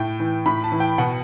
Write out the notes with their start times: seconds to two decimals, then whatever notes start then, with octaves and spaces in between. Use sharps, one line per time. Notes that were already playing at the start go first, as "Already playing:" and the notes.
Already playing: A2 G5
0.20 E3
0.46 A2 B5
0.64 A5
0.72 E3
0.80 G5
0.98 B2 F#5